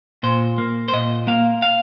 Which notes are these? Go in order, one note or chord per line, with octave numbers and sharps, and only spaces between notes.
A#2 C5
A#3
C5
A#2 D#5
A#3 F5
F5